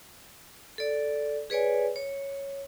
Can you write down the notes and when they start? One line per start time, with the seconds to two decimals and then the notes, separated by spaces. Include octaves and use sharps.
0.78 A4 D5
1.50 G#4 B4 C#5 D5 G#5
1.96 C#5